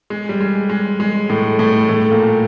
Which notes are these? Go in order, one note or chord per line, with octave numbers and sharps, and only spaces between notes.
G#3
G3
G#3
G#3
G#3
A2 A3
A2 A3
A2 A3
A#2 A#3